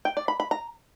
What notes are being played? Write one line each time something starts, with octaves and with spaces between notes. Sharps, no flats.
G5
D5
B5
B5
A#5